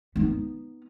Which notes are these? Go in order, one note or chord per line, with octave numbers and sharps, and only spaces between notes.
B3 D#4